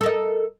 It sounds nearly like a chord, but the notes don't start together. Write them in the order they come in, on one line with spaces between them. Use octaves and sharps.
A4 A#4 D#5